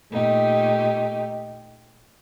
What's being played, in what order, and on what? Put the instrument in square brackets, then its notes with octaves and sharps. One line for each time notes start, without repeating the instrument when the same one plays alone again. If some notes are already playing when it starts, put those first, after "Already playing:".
[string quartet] A#2 A3 D#4 G4